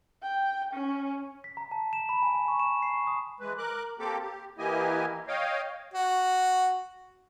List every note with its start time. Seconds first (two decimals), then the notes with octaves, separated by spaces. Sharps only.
0.23 G5
0.73 C#4
1.44 B6
1.57 A#5
1.71 A5
1.93 E7
2.09 B5
2.22 G#5
2.35 G#5
2.48 C#6
2.59 E7
2.82 C7
2.94 C#6
3.07 D#6
3.40 E3 G#3 B4
3.58 A#4 D6 F#6
3.99 A#3 C4 G4 A4 D6
4.22 G4
4.58 E3 A#3 E4 G4 D#5 G#5
5.28 C#5 D#5 F5 G5
5.94 F#4